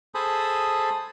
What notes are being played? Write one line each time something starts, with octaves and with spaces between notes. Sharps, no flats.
G#4 A4 C5 A5 B5 D#6